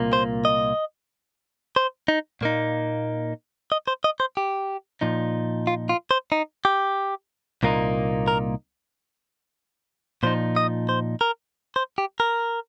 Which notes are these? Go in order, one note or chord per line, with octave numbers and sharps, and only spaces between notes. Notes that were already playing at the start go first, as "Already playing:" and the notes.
Already playing: C2 A#2 A#3
C5
D#5
C5
D#4
A#2 A#3 D#4
D#5
C5
D#5
C5
G4
A#2 F3 D#4
F4
F4
C5
D#4
G4
C2 A#2 A#3 D#4
A#4
A#2 F3 D#4 C5
D#5
C5
A#4
C5
G4
A#4